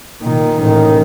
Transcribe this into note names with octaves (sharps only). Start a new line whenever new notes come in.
A#2 D#3
A1 D#3